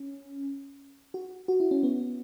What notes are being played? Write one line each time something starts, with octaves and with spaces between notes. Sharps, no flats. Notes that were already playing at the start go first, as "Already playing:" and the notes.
Already playing: C#4
F#4
F#4
E4
C#4
B3